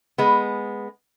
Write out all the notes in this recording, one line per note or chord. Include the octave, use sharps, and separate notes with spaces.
G#3 B3